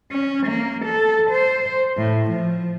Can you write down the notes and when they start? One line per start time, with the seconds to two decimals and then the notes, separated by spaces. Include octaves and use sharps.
0.11 C#4
0.47 A#3
0.85 A4
1.31 C5
1.98 A2
2.30 F3